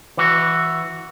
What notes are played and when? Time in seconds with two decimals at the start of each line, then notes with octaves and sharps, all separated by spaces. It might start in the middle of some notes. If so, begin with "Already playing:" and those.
0.17 E3 F#4